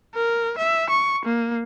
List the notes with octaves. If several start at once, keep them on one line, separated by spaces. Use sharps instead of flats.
A#4
E5
C#6
A#3